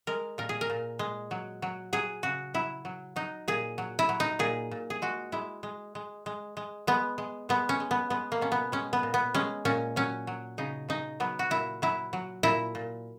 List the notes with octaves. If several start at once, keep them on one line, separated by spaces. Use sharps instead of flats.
G#3 A#4
A#2 A#4
G#4
A#4
A#2
G#3
F#3
F#3
F#3 G#4
C#3 F#4
F#3 E4
F#3
F#3 D#4
A#2 G#4
F#3
E4
F#3
D#4
A#2 G#4
A#2
G#4
G#3 F#4
G#3 E4
G#3
G#3
G#3
G#3
G#3 B3
G#3
G#3 B3
C#4
G#3
B3
G#3 B3
A#3
B2 C#4
B3
G#3 C#4
B3
A#2
B3
G#3 C#4
A#2 C#4
F#3 C#4
F#3
C#3 D#4
C#3 D#4
F#3 B3
F#4
A#2 E4
F#3 E4
F#3
A#2 E4
A#2